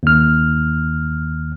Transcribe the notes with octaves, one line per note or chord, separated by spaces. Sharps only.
D#2 F6